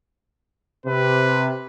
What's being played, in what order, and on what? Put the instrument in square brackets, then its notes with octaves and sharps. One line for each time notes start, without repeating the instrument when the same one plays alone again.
[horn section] C3 [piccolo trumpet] B4